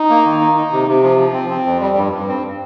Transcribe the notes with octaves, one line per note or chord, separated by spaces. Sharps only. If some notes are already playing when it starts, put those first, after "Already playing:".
Already playing: D#4
A#3
D#3
D#4
D#4
C3
C3
F3
F3
C4
C4
F2
G3
G2
G2
C4